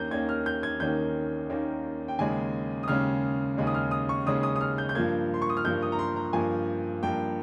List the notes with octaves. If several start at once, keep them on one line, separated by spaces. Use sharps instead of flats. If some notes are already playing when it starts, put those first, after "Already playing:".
Already playing: D#2 D#3 A#3 C#4 A#5 G6
D#2 D#3 A#3 C#4 G#6
F6
G6
G#6
D#2 D#3 A#3 C#4 G6
D#2 D#3 A#3 C#4
G5
D#2 C#3 G#3 C#4 G#5
D#6
D#2 C#3 G#3 C#4 F6
D#2 C#3 G#3 C#4
D#6
F6
D#6
C#6
D#2 C#3 G#3 C#4 D#6
D#6
D#6
F6
G6
G6
G2 F3 A#3 G#6
C6
C#6
D#6
F6
G2 F3 A#3 G6
D#6
A#5
C6
A#5
G2 F3 A#3 G#5
G2 F3 A#3 G5